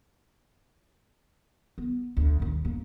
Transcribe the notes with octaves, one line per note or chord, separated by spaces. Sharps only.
B3
D2
G#1 D#2
G1 A#3